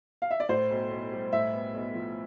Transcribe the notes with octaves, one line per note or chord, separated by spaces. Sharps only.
F5
E5
D5
A2 C5
B1
B1
G3
A2 E5
B3
B1
F3